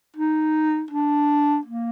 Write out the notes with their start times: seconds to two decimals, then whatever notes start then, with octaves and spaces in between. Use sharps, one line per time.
0.16 D#4
0.91 D4
1.66 A#3